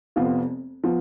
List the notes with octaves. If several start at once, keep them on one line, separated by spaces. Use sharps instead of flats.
F1 F2 F3 B3 F4
F3 B3